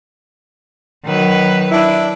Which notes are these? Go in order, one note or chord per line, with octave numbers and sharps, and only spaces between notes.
D#3 F#3 B4
D4 E4